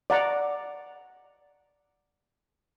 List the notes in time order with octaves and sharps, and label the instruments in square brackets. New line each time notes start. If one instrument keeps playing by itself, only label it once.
[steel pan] D5 F#5 A#5